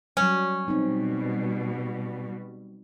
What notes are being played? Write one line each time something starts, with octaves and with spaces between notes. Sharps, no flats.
F#3 G3 C#4
B2 G3 C4 D#4